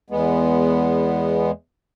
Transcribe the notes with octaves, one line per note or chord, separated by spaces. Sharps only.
E2 G#3 B3